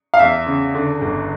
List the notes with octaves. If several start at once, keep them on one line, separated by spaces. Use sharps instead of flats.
F5
E2 E5
C#3
D3
G1